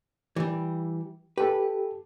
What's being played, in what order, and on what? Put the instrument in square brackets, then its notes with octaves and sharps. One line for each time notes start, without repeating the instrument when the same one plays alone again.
[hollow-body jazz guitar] E3 G3
[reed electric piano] G4 A4 [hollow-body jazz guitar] B4